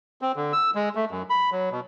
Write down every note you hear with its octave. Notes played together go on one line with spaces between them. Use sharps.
C4
D3
E6
G#3
A3
F#2
B5
F#3
B2